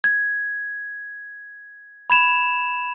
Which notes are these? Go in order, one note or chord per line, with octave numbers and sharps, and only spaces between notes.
G#6
B5 G#6 E7 F7